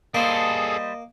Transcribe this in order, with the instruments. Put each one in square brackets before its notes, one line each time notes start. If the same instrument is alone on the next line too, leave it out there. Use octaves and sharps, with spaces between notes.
[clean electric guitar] G3 C5 [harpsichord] A#3 [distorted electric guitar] G#4 A4 [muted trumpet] D#5